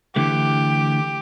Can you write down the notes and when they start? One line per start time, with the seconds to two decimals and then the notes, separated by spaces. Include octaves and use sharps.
0.16 D3 E3 A3 G4